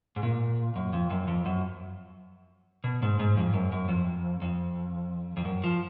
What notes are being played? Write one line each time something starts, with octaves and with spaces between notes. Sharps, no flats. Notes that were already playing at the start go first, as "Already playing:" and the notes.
G#2
A#2
F#2
F2
F#2
F2
F#2
B2
G#2
G#2
F2
F#2
F#2
F2
F2
F2
F#2
F3